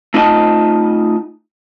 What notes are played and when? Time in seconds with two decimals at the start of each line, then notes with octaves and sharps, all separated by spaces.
0.14 A3 D#4 F4 D#5 A5